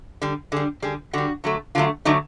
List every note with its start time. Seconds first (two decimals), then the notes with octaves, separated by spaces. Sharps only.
0.22 D3 G3
0.52 D3 G3 G#4
0.82 D3 G3 G#4
1.13 D3 G3 F#4
1.44 D3 F#3 A3
1.75 D3 F#3 A3 F4
2.05 D3 F#3 A3 D#4